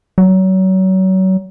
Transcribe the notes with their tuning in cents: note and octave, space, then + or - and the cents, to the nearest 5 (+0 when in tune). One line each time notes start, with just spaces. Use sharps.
F#3 +30